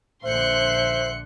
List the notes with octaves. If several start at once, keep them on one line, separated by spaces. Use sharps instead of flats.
A#1 D3 C5 E5 C6 F#6 C#7